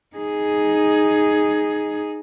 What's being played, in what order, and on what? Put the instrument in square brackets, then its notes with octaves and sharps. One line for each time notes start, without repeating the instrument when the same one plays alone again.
[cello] D#4 G#4